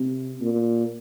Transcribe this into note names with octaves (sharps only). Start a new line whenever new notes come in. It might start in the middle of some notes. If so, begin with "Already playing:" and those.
Already playing: C3
A#2